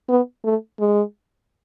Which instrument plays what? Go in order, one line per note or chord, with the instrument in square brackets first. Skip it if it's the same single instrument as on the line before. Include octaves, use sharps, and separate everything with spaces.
[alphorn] B3
A3
G#3